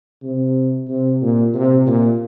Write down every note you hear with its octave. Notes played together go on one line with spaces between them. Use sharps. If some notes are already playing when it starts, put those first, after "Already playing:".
C3
C3
A#2
C3
A#2